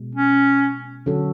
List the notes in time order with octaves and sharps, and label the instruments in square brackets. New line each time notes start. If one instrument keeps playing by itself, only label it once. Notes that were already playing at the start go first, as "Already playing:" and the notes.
Already playing: [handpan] B2 G#3
[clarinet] C#4
[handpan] D3 F#3 C#4 F#4 A4